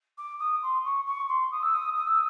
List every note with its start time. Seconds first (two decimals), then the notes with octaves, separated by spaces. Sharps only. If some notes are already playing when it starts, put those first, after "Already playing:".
0.18 D6
0.40 D#6
0.63 C6
0.85 C#6
1.06 C#6
1.29 C6
1.51 D#6
1.62 E6
1.74 D#6
1.96 D#6
2.07 E6